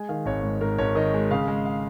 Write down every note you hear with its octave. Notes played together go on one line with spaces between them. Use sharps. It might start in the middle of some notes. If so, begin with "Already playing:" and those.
Already playing: G#3 G#5
D#3 F5
G#1 C#5
G#2
G#2 A#4
G#1 C#5
D#3 D#5
G#3
C#3 F5
G#3
F5